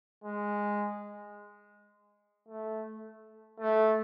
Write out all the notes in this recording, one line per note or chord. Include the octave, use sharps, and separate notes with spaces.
G#3
A3
A3